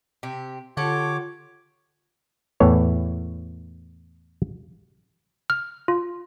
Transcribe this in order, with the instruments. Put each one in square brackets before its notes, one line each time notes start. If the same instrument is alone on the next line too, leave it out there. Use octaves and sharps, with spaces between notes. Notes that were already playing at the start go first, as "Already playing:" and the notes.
[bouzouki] C3 G4
[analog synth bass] D3 [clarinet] F4 [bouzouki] G4 A4 F#5 [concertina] C#5 D6
[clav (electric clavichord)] E2 A2 E3 C#5
[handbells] F6
F4